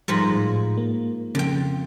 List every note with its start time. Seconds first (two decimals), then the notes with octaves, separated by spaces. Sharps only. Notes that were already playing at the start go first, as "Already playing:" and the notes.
0.08 G#2 F3 G3 B5 A#6
0.32 A2
0.77 A#3
1.35 F2 C#3 G5